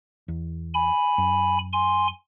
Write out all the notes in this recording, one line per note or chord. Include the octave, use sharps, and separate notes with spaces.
E2
G#5 B5
F#2
G#5 C6